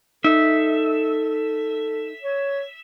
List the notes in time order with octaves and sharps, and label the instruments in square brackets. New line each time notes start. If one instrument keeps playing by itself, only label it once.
[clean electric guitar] D#4 [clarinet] A4 [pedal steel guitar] E5
[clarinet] C#5